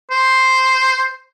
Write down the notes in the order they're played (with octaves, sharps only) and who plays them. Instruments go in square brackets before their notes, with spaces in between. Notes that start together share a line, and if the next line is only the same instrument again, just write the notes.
[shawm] C5